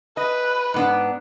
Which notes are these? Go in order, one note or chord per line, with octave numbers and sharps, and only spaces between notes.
B4 D#5
G#2 B3 D4